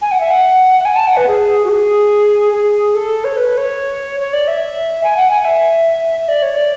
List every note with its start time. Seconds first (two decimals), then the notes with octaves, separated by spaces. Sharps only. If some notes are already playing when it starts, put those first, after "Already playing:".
0.01 G#5
0.11 F#5
0.20 E5
0.30 F#5
0.80 F#5
0.85 G#5
0.96 A5
1.07 F#5
1.17 B4
1.28 G#4
1.64 F#4
1.69 G#4
2.53 G#4
2.95 A4
3.24 C#5
3.37 B4
3.57 C#5
4.20 C#5
4.33 D5
4.48 E5
5.04 G#5
5.17 F#5
5.31 G#5
5.45 E5
6.28 D5
6.42 C#5
6.56 D5